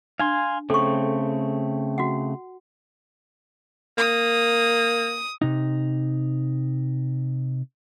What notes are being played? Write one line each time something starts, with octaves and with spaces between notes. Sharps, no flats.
D4 F5 G#5 C6
C#3 A3 C4 A4 C#6
F#4 F#5
A#3 D#6
C3 D#4